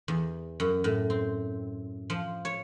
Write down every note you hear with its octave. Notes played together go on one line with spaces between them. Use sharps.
E2
F#2
A2
C4
F3
C#5